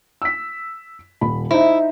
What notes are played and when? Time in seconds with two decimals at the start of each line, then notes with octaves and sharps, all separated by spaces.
0.22 E6 B6
1.21 D#1 B5
1.51 D#4 E4 C5